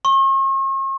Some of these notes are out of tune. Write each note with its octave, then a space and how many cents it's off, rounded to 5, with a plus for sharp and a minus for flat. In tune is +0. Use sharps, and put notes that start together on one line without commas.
C#6 -45